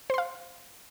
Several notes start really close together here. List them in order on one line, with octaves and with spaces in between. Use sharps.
C5 C6 F5